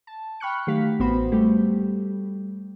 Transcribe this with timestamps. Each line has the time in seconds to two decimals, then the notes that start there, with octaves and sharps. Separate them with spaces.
0.07 A5
0.40 G5 B5 C#6 F6 F#6 C#7
0.67 D#3 F#3 A3 G4 F5 B6
0.99 A1 B3 F#4 C5 B5
1.32 G3 A3 G4